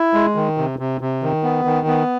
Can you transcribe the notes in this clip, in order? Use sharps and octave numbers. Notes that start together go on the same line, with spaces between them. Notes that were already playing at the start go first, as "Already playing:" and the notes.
Already playing: E4
G#3
D#3
C3
C3
C3
D#3
B3
D#3
B3